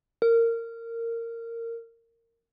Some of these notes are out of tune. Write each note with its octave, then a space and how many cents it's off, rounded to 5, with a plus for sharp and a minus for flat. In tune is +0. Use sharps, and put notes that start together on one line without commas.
A#4 -20